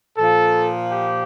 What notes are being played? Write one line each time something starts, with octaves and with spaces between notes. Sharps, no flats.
A#2 F3 A4
G4